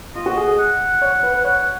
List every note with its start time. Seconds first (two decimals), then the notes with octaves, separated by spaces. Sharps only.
0.15 F4 D#5
0.26 F#4
0.37 G#4
0.47 G#4
0.58 F#5
1.02 C#5
1.23 B4
1.34 B4
1.44 C#5 F#5